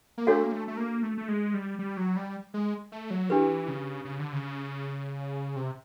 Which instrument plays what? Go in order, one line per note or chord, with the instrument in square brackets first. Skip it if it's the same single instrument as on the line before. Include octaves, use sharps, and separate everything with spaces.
[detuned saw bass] A#3
[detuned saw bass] A3 [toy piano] D4 F#4 A4 C#5 F5
[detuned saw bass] A#3
A3
A3
A#3
A3
A3
G#3
G3
G3
F#3
G3
G#3
A3
F#3
[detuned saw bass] E3 [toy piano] D4 G4 B4
[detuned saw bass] C#3
C#3
D3
C#3
C3